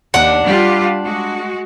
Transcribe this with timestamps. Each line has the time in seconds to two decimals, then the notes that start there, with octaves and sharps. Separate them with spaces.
0.14 D#2 D4 F#5
0.44 G3 F4 G4
1.04 G#3 F#4